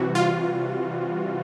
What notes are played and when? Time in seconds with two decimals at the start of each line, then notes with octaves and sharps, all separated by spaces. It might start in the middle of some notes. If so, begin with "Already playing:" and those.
Already playing: C3 E3 G3 F#4
0.15 F4